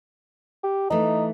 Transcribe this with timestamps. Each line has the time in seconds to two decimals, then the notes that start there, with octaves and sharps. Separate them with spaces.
0.64 G4
0.90 E3 A3 D#4